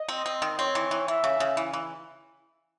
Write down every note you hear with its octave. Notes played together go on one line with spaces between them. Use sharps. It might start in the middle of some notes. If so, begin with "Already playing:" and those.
Already playing: D#5
C4
C4
D#3
C4 C#5
E3
E3
E3 E5
C#3
C#3
E3
E3